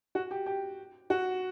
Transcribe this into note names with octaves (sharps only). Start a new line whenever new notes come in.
F#4
G4
G4
F#4